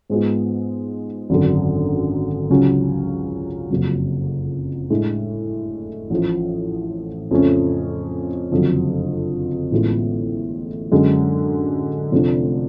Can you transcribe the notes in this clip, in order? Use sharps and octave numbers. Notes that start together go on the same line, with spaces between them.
G#2 G#3 B3 F4
G#1 F#2 D3
C#2 C#3 F#3 C#4
F#1 F2 C#3 F#3
A2 G#3 D4
A1 A2 F3
F2 C#3 F3 A3 C#4
F#1 F2 D3 F#3
A1 A2 G#3 B3 F4
F#2 D3 G#3 C#4
F1 F2 F3 A3 D4